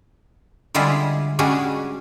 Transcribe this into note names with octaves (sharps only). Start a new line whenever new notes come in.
D3 G3 G#3 E4 F4 G#4
G3 G#3 C#4 D4 F#4 G#4